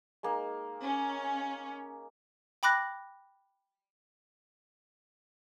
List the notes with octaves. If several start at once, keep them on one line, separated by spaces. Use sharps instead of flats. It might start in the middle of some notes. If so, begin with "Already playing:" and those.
G#3 A#3 D#4
C#4
G5 B5 D6 F#6 A#6